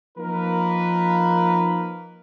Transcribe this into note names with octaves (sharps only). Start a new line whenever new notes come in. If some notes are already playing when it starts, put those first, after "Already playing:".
F3 A#3 D#4 A#4 B4